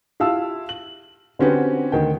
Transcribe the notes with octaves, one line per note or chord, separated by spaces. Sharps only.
E4 F4 G4 F5 A5 E6
F#7
D3 C4 C#4 F#4 G4 B4
D2 D#3 G5